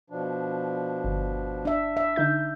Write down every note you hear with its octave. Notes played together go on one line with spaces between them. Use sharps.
B2 F3 D4
G1
D4 E5
E5
D3 D#4 G6